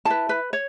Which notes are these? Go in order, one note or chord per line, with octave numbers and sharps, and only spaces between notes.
E4 B4 A5
B4
C#5